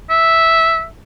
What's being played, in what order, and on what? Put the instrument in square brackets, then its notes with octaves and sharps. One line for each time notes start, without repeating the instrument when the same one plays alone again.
[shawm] E5